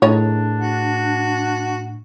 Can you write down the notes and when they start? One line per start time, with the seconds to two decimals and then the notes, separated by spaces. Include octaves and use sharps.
0.02 A2 D#3 D4 G#4 C#5
0.60 F#4